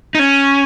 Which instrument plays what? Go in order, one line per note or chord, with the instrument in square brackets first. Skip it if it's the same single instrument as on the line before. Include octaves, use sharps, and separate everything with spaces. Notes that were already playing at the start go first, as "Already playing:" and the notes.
[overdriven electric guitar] D#4
[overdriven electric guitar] C#4 [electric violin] G#5